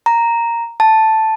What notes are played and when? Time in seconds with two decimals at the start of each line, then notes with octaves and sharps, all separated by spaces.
0.06 A#5
0.80 A5